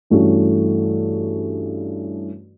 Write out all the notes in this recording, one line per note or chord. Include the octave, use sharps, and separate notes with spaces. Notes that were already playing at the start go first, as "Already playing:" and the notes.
G2 E3 A3 C#4 F#4